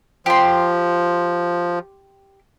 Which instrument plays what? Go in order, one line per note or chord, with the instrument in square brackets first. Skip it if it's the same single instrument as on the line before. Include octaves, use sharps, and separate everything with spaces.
[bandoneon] F3 [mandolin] G4 C6